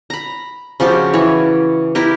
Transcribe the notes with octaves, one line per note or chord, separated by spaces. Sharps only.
A#5 B5
C#3 F3 F#4 G4
E3 C#5
E4 G4 A#4